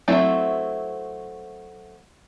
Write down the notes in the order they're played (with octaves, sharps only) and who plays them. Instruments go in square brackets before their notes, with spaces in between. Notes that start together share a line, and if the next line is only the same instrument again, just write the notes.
[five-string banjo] F#3 A3 C4 E4